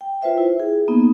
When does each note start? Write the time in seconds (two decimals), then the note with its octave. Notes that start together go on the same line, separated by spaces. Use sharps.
0.01 G5
0.22 F4 B4 C5 E5 G5
0.38 E4
0.60 G#4
0.88 A#3 B3 D#4